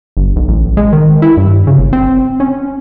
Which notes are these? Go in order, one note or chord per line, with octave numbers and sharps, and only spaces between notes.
G1
B1
A1
G#3
D#3
E4
G2
C#3
G1
C4
C#4